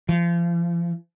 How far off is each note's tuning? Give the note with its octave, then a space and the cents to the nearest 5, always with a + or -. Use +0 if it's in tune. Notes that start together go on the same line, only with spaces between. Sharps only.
F3 -35